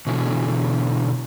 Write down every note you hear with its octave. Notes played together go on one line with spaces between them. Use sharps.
B2 D3 E3